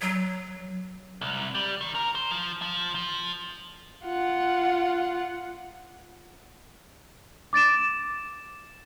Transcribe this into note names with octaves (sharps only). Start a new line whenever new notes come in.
F#3
C2
G3
D#3
A#4
C5
F3
F3
F3
F4 F#5
D6 A6 D7 E7